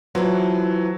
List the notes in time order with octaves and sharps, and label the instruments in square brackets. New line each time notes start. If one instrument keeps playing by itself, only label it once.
[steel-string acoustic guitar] E3 A3 E4 [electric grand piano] F#3 [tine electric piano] F4 C5